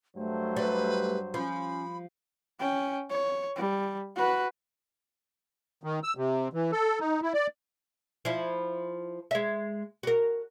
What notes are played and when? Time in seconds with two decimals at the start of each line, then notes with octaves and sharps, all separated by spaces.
0.16 G2 F#3 A3 C5
0.56 G3 B4
1.34 F3 C#4 B5
2.59 C#4 G5
3.10 C#5
3.56 G3
4.16 F#4 B4
5.84 D#3
6.03 E6
6.17 C3
6.53 E3
6.72 A4
7.00 D#4
7.22 E4
7.34 D5
8.25 F3 E4
9.31 G#3 E5
10.03 F#4 A#4